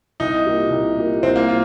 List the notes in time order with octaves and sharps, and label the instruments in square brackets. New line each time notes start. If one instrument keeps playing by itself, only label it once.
[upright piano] C2 [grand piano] D#4
[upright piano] A#2 A#3 G4
C2
A#2 A#3 G4
[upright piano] C2 [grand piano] C4
[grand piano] A#3
[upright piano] A#2 [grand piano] F4